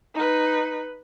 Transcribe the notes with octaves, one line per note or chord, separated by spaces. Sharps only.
D#4 B4